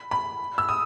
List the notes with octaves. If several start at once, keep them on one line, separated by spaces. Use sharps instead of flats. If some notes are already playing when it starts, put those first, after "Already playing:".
Already playing: B5
B5
E6
D#6